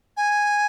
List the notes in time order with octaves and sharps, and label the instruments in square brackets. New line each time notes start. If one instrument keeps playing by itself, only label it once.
[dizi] G#5